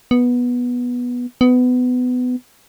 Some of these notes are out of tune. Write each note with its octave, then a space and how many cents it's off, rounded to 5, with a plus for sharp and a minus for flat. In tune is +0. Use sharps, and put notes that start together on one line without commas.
B3 -10
B3 +20